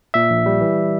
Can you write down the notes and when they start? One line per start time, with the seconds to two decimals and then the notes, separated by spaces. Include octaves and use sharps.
0.14 A#2 E5
0.30 A#1
0.46 G3
0.61 E3